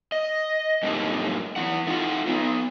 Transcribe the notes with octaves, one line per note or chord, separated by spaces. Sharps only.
D#5
F#2 A2 D3 G3 A#3 D#4
E3 E4 F#5
A3 D#4 F4 F#5
B3 D#4